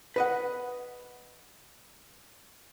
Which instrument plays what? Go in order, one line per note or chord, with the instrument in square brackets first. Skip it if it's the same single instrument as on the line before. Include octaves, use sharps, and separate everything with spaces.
[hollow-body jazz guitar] B4 D#5 F#5